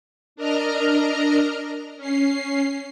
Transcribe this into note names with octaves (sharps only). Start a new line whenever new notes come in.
D4 A#4 D#5 A#5 F6
C#4 C7